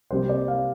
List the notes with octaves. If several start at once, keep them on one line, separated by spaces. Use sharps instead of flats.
C3 G3 A#3 C5
D5
F5